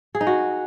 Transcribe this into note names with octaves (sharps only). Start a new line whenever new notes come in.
G#4
D#4
F#4